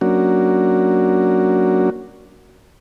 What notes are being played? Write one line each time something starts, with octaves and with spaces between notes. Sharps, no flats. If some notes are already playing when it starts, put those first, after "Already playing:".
F#3 A#3 C#4 D4 F#4